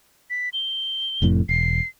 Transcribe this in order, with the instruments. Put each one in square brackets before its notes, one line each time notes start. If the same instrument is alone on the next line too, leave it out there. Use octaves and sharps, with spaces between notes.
[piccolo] B6
G7
[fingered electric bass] F1 F2 A2
[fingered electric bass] E1 [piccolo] C7